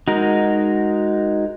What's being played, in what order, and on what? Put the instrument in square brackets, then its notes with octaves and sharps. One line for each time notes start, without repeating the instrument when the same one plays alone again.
[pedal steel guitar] G#3 D#4 F#4 A#4